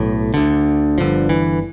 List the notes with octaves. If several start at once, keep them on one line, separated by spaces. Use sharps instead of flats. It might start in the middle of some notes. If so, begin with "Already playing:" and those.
Already playing: B1 A2
D2 D3
G1 G2 D3 F3
E3